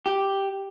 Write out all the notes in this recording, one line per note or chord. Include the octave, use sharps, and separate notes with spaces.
G4